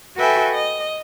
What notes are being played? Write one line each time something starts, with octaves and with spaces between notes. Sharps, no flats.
F#4 A4 B4 E5 G5 G#5
D#5